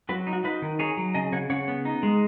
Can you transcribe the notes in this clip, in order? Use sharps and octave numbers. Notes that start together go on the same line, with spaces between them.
F#3 F#4 B4
D#4
F#4
D#4 F#4 B4
D#3
D#4 G#4 C#5
F#3
C#3 D#5 G#5
C#3 C#5 F#5
C#3 C#5 F#5
B3
D#4
G#3